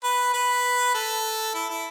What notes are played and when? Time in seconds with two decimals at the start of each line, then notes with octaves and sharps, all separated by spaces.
0.04 B4
0.34 B4
0.94 A4
1.54 E4
1.70 E4